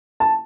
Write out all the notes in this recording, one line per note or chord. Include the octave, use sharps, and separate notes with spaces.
A5